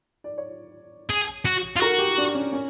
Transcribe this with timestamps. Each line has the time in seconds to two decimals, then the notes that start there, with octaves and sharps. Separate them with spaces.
0.24 D5
0.38 C#5
1.10 G#4
1.45 F#4
1.76 F4
1.81 F#4 A#4
1.98 G4
2.18 D4
2.35 C#4
2.53 C#4